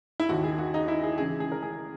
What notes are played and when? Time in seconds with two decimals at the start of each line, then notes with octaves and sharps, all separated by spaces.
0.20 E4
0.29 D#2 D#3 F#4
0.44 G#4
0.58 F#4
0.74 D#4
0.88 E4
1.03 G#4
1.18 C#2 C#3 E3 G#4
1.40 G#4
1.52 A#4
1.62 G#4